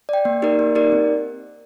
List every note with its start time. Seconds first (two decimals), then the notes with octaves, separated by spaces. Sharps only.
0.09 D5 G5
0.25 A#3
0.42 D#4 G4 A#4 D5
0.59 A#3
0.75 D#4 G4 A#4 D5
0.92 C4